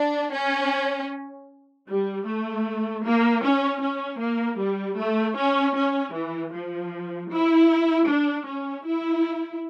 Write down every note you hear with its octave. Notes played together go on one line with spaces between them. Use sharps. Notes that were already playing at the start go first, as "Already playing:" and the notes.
Already playing: D4
C#4
G3
A3
A#3
C#4
C#4
A#3
G3
A3
C#4
C#4
E3
F3
E4
D4
C#4
E4